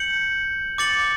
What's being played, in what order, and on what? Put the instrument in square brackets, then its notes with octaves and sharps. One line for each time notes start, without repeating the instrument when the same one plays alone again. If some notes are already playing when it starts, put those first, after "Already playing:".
Already playing: [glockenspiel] G6 C#7 F#7
D6 A6 C#7 F#7